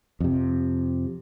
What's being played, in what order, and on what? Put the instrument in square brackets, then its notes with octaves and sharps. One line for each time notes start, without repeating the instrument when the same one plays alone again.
[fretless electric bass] F2 C3